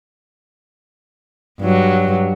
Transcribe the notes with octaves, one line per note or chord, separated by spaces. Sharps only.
G2 F#3